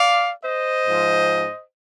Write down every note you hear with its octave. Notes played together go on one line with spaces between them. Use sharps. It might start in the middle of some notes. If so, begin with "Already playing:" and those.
Already playing: D5 F5
C5 D#5
G#2 F3